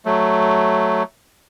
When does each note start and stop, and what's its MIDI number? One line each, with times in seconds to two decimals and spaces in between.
0.05 1.03 54
0.05 1.03 57